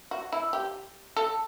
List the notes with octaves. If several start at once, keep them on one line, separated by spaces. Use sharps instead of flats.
F#4
E4
G4
A4